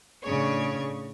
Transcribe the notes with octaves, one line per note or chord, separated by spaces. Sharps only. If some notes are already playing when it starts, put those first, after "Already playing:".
A2 C#3 D4 G#4 C#5 C#6